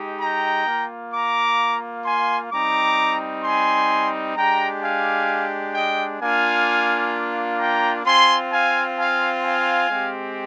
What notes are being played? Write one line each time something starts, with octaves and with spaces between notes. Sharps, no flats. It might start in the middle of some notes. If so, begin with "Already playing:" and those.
Already playing: G#3 D#4 G4
G5 A#5
A#3 F4
A#5 D6
G#5 C6
G3 C4 D#4 A#5 D6
G#5 C6
G#3 D4 G4 G5 A#5
F5 G#5
D#5 G5
A#3 D4 F4 F5 G#5
G5 A#5
C4 F4 G#5 C6
F5 G#5
F5 G#5
F5 G#5
G#3 C4 G4